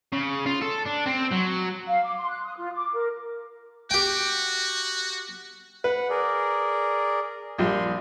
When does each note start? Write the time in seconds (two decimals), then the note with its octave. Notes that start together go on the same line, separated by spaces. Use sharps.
0.12 C#3
0.46 F4
0.61 A4
0.85 D4
1.06 C4
1.31 F#3
1.87 F5
2.03 D6
2.16 C6
2.29 F#6
2.44 D#6
2.58 F4
2.74 D6
2.93 A#4
3.91 F#4 G4 G5
5.84 B4 F#5
6.10 G#4 A#4 D5
7.58 A#1 G3 C6